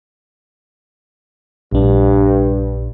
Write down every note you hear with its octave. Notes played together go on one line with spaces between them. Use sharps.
A#1 G2 D4